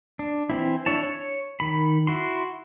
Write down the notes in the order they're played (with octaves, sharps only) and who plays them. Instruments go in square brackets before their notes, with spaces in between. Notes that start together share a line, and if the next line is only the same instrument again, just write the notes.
[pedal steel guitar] D4
E3 C4 E4
D4 E4 C#5 A5
C#5
D#3 B5
E4 F#4 C6